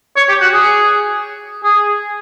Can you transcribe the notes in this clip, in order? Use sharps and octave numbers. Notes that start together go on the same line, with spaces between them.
C#5
G4
F#4
G#4
G#4